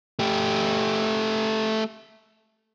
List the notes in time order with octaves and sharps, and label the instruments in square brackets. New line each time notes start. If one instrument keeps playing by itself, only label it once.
[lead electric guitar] A3 G4